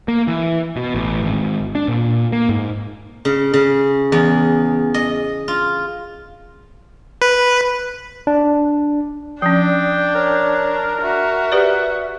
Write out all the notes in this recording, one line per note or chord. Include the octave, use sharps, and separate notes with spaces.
A#3
E3
B2
A1
G#1
D4
A#2
A#3
G#2
C#3
C#3
E2
D#5
F4
B4
D4
F3 C#4 D4 G5
A#4 C#5
F#4 E5
G4 B4 D5